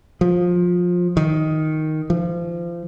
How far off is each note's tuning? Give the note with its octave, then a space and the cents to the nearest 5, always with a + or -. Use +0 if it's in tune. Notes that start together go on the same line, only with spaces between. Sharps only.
F3 +20
D#3 +5
F3 -30